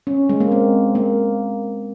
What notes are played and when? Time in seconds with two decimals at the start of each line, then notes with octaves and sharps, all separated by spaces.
0.07 C#4
0.29 G#3
0.40 A#3
0.52 C4
0.95 A#3